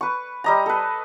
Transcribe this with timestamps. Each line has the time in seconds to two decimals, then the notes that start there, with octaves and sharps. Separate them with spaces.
0.01 B4 C#6
0.44 G3 D#5 A#5
0.66 A4 B4